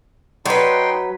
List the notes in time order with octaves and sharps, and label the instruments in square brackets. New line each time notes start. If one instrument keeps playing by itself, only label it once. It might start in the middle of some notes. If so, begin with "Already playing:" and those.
[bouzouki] F#3 B4 [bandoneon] D#4 G5 C6